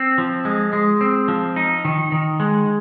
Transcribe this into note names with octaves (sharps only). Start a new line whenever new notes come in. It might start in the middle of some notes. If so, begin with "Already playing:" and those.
Already playing: C4
F3
G#3
G#3
C4
F3
D#4
D#3
D#3
G#3